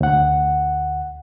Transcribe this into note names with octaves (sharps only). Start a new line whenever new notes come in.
D2 F#5